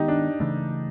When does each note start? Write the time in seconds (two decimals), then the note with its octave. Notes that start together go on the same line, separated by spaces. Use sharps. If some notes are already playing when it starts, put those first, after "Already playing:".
Already playing: D#3 G#3 B3 D#4 G4
0.08 D4
0.40 C#3 E3 A3